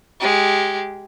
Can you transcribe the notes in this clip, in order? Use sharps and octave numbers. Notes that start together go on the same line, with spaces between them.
G#3 G4